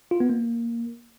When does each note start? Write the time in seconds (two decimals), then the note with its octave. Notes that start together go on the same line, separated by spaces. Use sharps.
0.11 F4
0.20 B3
0.30 A#3